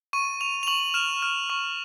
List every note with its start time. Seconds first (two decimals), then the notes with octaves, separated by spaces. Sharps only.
0.13 C#6 D#7
0.41 C#6 F7
0.63 F7
0.67 C#6 F#7
0.94 F6 E7
1.22 F6
1.50 C#6